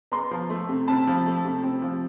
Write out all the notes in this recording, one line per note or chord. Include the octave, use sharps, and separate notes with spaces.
B3 A#5 C6
F3
A3
C3
C4 A5 B5
F3
A3
C3
C4
F3